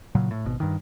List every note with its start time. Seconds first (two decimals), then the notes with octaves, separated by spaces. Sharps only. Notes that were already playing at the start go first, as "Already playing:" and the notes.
0.15 A#2 C#3 F#3
0.31 A2
0.45 G#1 B2
0.60 G2 D#3